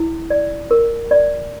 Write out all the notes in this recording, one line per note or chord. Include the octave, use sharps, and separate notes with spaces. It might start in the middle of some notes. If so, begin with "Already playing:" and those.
Already playing: E4
D5
A#4
D5